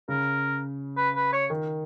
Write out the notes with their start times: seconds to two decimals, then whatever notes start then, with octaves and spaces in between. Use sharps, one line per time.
0.09 C#3 A#4
0.97 B4
1.16 B4
1.33 C#5
1.50 D#3